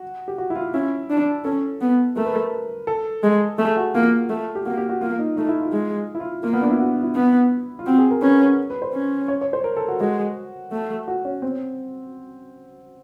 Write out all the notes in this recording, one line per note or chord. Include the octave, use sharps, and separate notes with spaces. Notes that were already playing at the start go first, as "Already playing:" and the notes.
Already playing: F#4
G4
F#4
E4
F4
C#4 E4
D4
C#4 A4
B3
A3 A#4
B4
A#4
A4
G#3
A3 G#4
F#4
A#3 F4
A3
G4
A#3 F#4
G4
F#4
A#3 F4
D#4
A3 D#4
E4
F4
G#3
E4
F4
A#3 F4
B3
D4
E4
F#4
E4
B3
F4
C4 F#4
G#4
A#4
C#4 B4
B4
C5
C#4
C#5
C#5
C5
A#4
A4
F#4
G#3 F#4
A3
F#4
C#4
C4